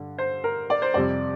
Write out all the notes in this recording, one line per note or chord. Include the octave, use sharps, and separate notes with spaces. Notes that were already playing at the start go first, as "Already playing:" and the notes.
Already playing: G2 D3
C5
A#4
D5
C5
F2 C3 G3 C4 D5